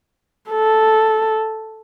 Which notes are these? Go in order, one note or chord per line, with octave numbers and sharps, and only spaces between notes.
A4